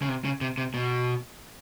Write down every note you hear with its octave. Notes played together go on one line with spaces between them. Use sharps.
C#3
C3
C#3
C3
C3
B2